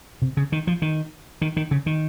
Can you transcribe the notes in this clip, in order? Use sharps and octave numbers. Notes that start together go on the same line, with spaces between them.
C3
C#3
D#3
F3
D#3
D#3
D#3
C#3
D#3